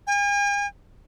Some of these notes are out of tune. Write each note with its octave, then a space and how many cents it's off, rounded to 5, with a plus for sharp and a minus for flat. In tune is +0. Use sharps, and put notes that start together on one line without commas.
G#5 -45